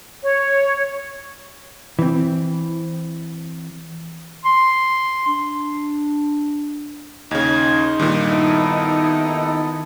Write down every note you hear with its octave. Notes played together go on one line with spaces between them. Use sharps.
C#5
E3 C4
C6
D4
D#2 C#3 D#4 G#6
C6
G2 A#2 D#3
B3 E4 A4